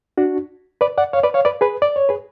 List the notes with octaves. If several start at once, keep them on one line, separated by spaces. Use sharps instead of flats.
D4 F#4
B4 D5
D5 F#5
C#5 F5
B4 D5
C#5 F5
B4 D5
G#4 B4
D5
C#5
G#4 B4